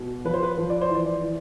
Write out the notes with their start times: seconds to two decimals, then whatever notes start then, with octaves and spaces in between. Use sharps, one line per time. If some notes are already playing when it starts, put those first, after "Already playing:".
Already playing: B2
0.24 F3 B4
0.34 C5
0.43 B4
0.58 F3
0.70 D5
0.81 C5
0.89 E3
0.95 D5
1.21 E3